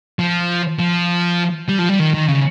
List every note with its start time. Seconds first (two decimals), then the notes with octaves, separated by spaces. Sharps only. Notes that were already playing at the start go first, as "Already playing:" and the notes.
0.19 F3
0.79 F3
1.68 G3
1.78 F3
1.89 G3
1.99 D#3
2.14 D#3
2.28 C#3